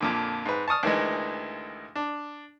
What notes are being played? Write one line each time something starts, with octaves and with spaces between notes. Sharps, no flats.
F2 A#2 D3
G#2 B4
A5 C#6 D#6 F6
D2 D#3 E3 G#3
D4